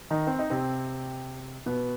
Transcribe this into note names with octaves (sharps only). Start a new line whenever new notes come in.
D#3 D#4
C4
D#4
C3 C4
B2 B3